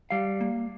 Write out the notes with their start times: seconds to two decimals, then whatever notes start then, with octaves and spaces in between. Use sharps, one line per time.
0.10 G3 F5
0.41 A#3